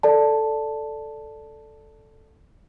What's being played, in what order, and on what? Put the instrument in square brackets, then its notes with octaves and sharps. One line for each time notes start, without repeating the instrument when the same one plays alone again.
[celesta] A4 D5 A5